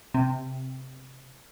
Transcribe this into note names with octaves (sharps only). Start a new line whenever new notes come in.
C3